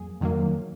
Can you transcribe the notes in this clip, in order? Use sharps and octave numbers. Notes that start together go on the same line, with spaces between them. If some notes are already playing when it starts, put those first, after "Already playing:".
Already playing: F2 F#3 A#3 G#4
F2 D#3 F#3 A#3